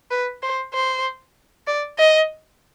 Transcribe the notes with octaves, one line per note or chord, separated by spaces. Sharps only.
B4
C5
C5
D5
D#5